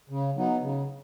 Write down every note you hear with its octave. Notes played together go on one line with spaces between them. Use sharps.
C#3
F#3 B3 D#4
C#3